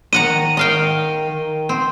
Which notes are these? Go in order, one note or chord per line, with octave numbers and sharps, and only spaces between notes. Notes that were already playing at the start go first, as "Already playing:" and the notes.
D#3 D#5 F#5 A#5 D#7
D#3 D#5 F5 G5
D#3
C4